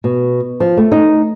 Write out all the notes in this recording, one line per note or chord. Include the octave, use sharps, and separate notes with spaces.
B2
F3
A3
D#4